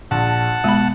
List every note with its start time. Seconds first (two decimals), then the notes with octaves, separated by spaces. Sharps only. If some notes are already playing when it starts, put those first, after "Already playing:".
0.11 A#1 F#5 A5
0.64 B2 G#3 B5